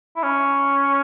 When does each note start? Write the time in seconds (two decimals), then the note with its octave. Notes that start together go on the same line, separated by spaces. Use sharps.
0.16 E4
0.23 C#4